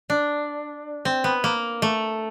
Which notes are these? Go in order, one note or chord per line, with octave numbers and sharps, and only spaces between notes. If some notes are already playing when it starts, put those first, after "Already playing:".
D4
C4
B3
A#3
A3